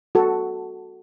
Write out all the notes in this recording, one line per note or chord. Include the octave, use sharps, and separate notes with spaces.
F#4 A4